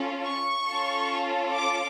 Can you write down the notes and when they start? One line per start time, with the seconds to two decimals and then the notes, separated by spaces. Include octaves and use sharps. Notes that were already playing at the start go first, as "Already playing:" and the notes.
Already playing: C#4 F4 A4
0.23 C#6
0.67 C#4 F4 A4
1.55 D6